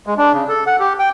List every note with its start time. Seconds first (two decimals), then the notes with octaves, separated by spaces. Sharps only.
0.07 G#3
0.18 D4
0.33 C#3
0.49 A4
0.67 F#5
0.80 G4
0.99 G5